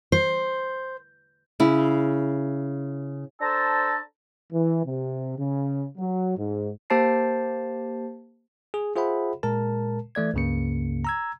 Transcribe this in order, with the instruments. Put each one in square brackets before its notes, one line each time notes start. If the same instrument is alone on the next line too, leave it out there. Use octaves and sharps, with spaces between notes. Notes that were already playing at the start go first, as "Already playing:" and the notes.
[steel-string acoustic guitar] C5
[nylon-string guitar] C#3 E4
[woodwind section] D4 A4 C5 A5 A#5
[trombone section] E3
C3
C#3
F#3
G#2
[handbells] A#3 G4 C5 A5 A6 C7
[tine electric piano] G#4
F4 G#4 C5 E5 F#5 B5
A#2 G#3 A#4 A5
E3 A3 D5 G#6
C#2 G2 C#3 A#3 C#7
A#5 E6 G#6